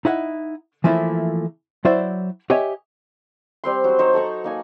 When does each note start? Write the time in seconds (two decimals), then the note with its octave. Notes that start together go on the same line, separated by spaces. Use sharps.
0.05 D#4 E4 F#5
0.84 E3 F3 A3 A#3 E4
1.85 F#3 E4 C5 D5 E5
2.50 G4 C#5 D#5 E5 G#5
3.64 G3 C4 C6
3.84 F#3 C5
3.99 D#4 C5 C#5
4.14 A4 F#5 A#5 C#6
4.44 A#3 D#4 G#5